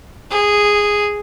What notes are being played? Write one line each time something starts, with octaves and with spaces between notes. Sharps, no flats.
G#4